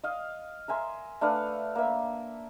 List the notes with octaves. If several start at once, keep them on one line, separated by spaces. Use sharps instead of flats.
D#5 F5
A#4 E5 G#5 C6
A3 D4 B4 F5
A#3 E5